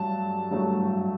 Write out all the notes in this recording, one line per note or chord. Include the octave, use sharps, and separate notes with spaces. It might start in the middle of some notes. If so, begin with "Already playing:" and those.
Already playing: G2 F#3 A3 A5
G2 F#3 A3